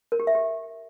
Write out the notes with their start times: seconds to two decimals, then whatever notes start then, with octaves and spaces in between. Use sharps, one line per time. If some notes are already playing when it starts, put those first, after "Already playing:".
0.12 A#4
0.20 G4
0.27 E5
0.35 G4